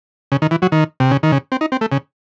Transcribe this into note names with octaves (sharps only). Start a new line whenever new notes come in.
C#3
D#3
E3
F#3
D#3
C3
C#3
D#3
C#3
C4
D#4
C4
A3
C#3